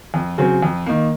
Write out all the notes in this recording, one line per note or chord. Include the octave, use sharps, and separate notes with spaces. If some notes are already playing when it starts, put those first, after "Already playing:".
F2
C#3 F#3 C4
F2
D#3 A#3